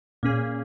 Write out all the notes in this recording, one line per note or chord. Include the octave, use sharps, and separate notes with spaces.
A#2 A#3 C#4 G#4